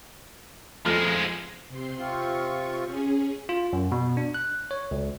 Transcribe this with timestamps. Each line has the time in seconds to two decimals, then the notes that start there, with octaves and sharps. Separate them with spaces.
0.86 F2 F3 G#3 A3 F6
1.69 C3 C4 C6
1.99 C3 C4 F4 C#6
2.85 C#4 G#4
3.49 F4
3.73 F#2
3.92 B2
4.17 D4
4.34 F#6
4.71 C#5
4.91 C#2